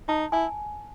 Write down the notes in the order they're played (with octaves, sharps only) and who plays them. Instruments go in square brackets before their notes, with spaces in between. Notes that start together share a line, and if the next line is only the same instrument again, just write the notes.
[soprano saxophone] D#4 [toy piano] A5
[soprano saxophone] E4 [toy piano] G#5